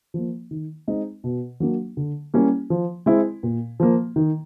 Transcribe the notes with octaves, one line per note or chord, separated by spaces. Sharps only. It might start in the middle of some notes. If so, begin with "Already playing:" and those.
F3 A#3
D#3
G#3 C4 D#4
B2
F#3 A#3 D4
D3
G3 A#3 C#4 E4
F3
G#3 C4 E4
A#2
F3 A#3
D#3